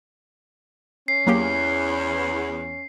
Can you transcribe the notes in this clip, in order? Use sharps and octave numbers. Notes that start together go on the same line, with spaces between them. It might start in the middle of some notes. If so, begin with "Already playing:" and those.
C#4 C7
E2 F#3 A#3 G4